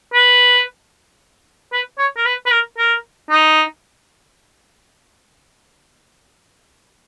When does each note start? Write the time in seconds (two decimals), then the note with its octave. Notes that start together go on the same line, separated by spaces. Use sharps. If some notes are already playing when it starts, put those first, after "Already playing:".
0.14 B4
1.73 B4
1.98 C#5
2.17 A#4
2.26 B4
2.46 B4
2.51 A#4
2.78 A#4
3.30 D#4